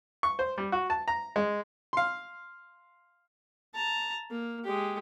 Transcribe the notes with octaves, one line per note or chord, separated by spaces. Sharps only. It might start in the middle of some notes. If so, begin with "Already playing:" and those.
C#6
C5
G3
F#4
A5
A#5
G#3
F5 C6
A5 A#5
A#3
G#3 G4